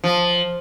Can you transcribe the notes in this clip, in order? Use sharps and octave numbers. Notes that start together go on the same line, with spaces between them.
F3